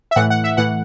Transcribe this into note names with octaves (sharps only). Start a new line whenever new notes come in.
E5
A2 E3 F#5
F#5
E5
A2 E3 F#5